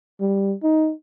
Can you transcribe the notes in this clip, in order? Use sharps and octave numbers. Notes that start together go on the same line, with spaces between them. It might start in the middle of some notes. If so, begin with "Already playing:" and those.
G3
D#4